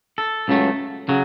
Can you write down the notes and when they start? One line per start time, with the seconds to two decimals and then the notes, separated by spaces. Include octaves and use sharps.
0.18 A4
0.48 C#2 C#3 F#3 A3
1.09 C#3 F#3